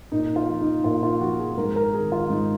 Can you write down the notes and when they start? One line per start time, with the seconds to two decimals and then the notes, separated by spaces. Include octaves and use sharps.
0.12 A#2 D#4
0.36 F4
0.48 F3
0.61 D#4
0.84 A#2 F4
1.03 F4
1.21 F3 F#4
1.39 G#4
1.57 G#2 A#4
1.76 A#4
1.94 D#3 G#4
2.12 F4
2.30 G#2 D#4